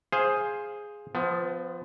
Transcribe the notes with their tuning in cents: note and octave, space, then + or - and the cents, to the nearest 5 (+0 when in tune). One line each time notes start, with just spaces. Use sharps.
G#4 +0 C5 +10 F5 +0
F3 +0 B3 +30